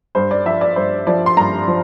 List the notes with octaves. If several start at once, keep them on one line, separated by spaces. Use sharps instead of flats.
G2 C5
D5
F3 E5
D5
G2 C5
F3 D5
C6
G2 A#5
F3